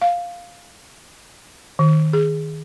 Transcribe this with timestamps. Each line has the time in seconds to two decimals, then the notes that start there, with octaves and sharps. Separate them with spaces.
0.01 F5
1.79 D#3
2.13 G#4